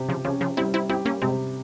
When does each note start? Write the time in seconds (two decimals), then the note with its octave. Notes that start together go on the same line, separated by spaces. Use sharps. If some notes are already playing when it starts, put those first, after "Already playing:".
Already playing: C3 G4
0.09 C#3 F3
0.25 C#3 F3 C#4
0.41 C#3 F3
0.57 G3 C4 E4
0.74 C4 E4
0.89 C4 E4 G4
1.05 A#3 C#4
1.22 C3 G#3 C4